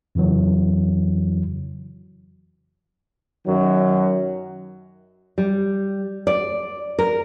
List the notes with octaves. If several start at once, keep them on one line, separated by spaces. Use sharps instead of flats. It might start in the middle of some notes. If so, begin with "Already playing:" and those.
F2 C#3 E3 F#3
F#2 D#3 F#3
G3
D5
A#4